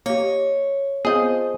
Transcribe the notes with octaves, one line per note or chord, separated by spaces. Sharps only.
A#3 G4 C#5 D#5
F3 B3 C4 G#4 D#5 G6